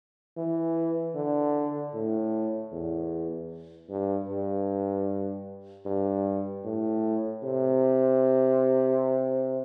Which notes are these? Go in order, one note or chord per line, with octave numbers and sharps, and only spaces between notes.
E3
D3
A2
E2
G2
G2
G2
A2
C3